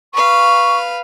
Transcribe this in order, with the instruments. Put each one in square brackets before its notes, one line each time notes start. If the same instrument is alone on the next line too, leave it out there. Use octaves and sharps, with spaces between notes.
[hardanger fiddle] B4 F5 [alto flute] C#6